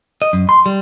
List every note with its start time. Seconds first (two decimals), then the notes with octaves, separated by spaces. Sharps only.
0.22 D#5
0.33 F#2
0.49 C6
0.66 G3